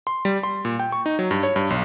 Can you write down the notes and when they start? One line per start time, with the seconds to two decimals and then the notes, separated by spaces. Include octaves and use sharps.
0.07 C6
0.25 G3
0.43 C6
0.65 A#2
0.79 G5
0.92 C#6
1.06 D#4
1.19 F#3
1.31 G2
1.43 C#5
1.56 G2
1.70 B1